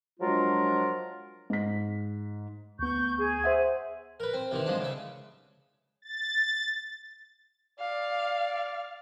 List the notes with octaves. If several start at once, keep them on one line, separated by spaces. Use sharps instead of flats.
F3 F#3 G#3 D4 F4 A#4
G#2 B6
D2 B3 C#6 G6
G#4
C5 E5 F#5
A#4 B4
C4
C3 D#3 E3
F3 G#3 D4
C#3 E5
A6
D5 F5